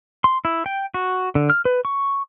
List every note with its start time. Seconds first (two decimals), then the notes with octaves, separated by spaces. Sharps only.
0.24 C6
0.45 E4
0.66 G5
0.94 F#4
1.35 D3
1.50 F6
1.65 B4
1.85 C#6